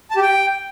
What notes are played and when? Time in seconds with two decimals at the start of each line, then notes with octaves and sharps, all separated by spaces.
0.11 A5
0.16 G4
0.22 G5